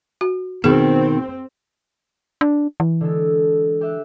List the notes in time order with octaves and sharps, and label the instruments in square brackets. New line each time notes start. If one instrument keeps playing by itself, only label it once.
[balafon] F#4
[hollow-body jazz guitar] B2 [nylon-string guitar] D#3 [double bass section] C4 [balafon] G#4
[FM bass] D4
E3
[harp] D3 G#3 A4
G4 E5 F#6